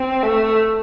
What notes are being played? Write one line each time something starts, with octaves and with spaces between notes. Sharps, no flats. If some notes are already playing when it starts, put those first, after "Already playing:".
Already playing: C4
A3